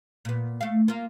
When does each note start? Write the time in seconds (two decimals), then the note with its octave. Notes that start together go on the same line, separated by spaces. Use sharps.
0.25 A#2 B3
0.61 A3 F5
0.88 A#3 F4